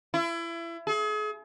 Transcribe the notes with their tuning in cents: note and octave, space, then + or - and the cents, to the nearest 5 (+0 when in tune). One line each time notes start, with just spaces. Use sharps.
E4 +30
G#4 +40